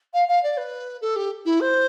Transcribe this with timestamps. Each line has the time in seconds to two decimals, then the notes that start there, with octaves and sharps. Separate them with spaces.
0.14 F5
0.28 F5
0.43 D5
0.58 B4
1.01 A4
1.16 G4
1.45 E4
1.61 C5